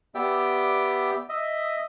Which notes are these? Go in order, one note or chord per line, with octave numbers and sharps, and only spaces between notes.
B3 G4 D5 E5 G5
D#5 E5